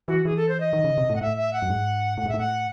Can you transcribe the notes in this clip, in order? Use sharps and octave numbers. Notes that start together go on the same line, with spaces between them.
E3 F#4
E3 G#4
A4
C5
D#5
D#3
C#3
C3
A2
F#5
A2 E5
E5
F#5
F#2
G#2
A2 F#5
G#2
A2 E5
F#5